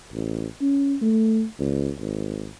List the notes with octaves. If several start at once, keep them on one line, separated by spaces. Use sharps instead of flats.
A1
C#4
A3
C#2
G#1